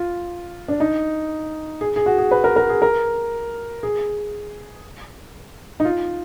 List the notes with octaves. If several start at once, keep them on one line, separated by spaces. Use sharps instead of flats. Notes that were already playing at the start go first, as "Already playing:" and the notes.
Already playing: F4
D4
D#4
G#4
G#4
F#4
G#4
B4
A#4
A#4
G#4
A#4
G#4
D#4
F4